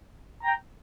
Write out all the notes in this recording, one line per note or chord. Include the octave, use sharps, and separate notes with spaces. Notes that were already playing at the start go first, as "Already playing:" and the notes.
G5 A#5